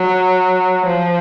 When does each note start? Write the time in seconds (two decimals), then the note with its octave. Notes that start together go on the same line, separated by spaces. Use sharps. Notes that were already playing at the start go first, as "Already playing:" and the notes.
Already playing: F#3
0.86 F3